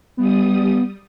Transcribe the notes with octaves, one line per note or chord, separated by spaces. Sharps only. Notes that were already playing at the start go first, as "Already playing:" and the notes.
G3 B3 D#6